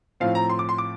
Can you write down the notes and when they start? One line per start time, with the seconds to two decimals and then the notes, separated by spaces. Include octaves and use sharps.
0.20 A2 F3 C4 F5
0.35 A#5
0.49 C6
0.59 D6
0.69 C6
0.78 D6